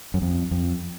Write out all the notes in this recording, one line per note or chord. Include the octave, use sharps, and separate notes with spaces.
F#2
F2
F2